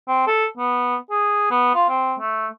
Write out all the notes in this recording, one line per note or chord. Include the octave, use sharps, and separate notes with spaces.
C4
A4
B3
G#4
B3
F4
C4
A3